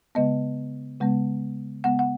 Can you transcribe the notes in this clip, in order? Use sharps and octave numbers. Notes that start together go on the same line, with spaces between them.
C#3 G#3 B3 D#5
C#3 G#3 B3
C#3 G#3 B3 F#5
F#5